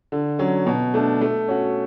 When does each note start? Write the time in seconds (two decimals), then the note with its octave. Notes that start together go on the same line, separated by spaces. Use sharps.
0.12 D3
0.39 F#3 C#4
0.67 B2
0.94 A3 D4
1.21 A3
1.48 C#4 F#4